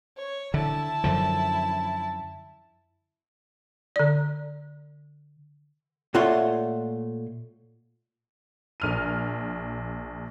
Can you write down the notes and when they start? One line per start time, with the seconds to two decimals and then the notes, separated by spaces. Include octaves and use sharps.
0.17 C#5
0.54 D3 E4 A5
1.04 F#2 D3 F3
3.96 D3 D5
6.14 A#2 A3 F4 C#5 F#5 C6
8.80 A#1 F6 D#7